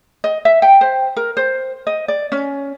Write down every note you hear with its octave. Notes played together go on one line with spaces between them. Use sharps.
D#5
E5
G5
C5
A#4
C5
D#5
D5
C#4